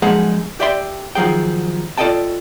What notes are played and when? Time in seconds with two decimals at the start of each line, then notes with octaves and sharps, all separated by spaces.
0.02 F#2 F3 G#3 D#4 G#4 F#5
0.60 G4 D5 E5 G5 C6
1.15 D#3 F3 F#3 G#4 G5
1.97 F4 A4 D5 D#5 G5 A5